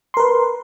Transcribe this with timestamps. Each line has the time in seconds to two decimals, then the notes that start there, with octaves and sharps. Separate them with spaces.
0.14 C6
0.17 A#4
0.20 B4